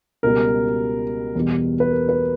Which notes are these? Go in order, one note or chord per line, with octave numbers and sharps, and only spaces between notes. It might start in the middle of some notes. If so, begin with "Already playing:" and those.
C#2 B2 G3 A#4
E2 B2 G3
B4
A#4
B4